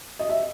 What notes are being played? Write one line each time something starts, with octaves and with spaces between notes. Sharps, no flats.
D#5
E5